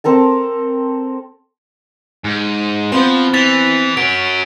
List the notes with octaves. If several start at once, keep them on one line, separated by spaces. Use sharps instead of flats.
C4 A4 A#4 A5
G#2
F3 B3 C4 C5
E3 A6 B6 F7
F#3 C#4 D7